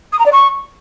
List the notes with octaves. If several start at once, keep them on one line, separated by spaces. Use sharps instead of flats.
D#6
A#5
D5
C#6